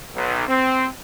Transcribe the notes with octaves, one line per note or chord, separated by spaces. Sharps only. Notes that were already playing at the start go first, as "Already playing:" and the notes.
B1
C4